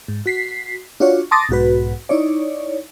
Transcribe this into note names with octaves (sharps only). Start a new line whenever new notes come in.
G#2
F#4 B6 C7
D4 F4 F#4 C#5
A5 C6 D6 D#6 A6 A#6
B1 G#2 F#4 B4
D#4 E4 C#5 D5